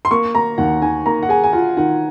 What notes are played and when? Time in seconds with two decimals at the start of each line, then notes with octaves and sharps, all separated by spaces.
0.05 C6
0.11 A#3 C#6
0.35 A#3 A#5
0.58 D#2 F#5
0.82 D#3 G#5
1.06 A#3 A#5
1.23 F#5
1.29 G#4 G#5
1.43 G#5
1.53 F4 F#5
1.77 D#3 F#5